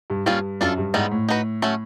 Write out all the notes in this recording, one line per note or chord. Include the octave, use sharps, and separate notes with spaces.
G2
G2 G3 A#3 C#4 F4 G#4
F#2 D4 F4 A4
G2
G#2 E3 G3 B3 D#4
A2
D#4 F#4 B4
F#3 A3 C#4